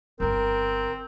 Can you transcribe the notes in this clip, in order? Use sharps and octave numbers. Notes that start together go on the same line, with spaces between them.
G1 D3 C4 A#4